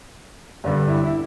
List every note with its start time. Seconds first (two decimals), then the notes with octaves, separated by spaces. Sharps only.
0.64 G2 D3 G3 D4
0.88 E4
1.04 E4